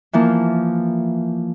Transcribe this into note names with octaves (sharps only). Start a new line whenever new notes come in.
E3 F3 A#3